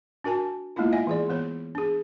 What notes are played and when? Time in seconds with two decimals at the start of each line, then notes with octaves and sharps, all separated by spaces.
0.24 D4 F#4 A#4 G#5 A5
0.76 G#3 A#3 B3 D4 E4 F4
0.93 D#5 E5 F#5 G#5
1.07 E3 G#4 D5
1.29 E3 B3 C5 C#5
1.75 D4 G#4